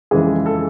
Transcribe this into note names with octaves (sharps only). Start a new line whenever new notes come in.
F2 C#3 E3 G#3 G#4
A4